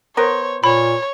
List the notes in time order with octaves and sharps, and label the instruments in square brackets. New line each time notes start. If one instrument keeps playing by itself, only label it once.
[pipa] B3 A#4 C5 [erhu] C#5
[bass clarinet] A#2 [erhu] C#5 [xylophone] B5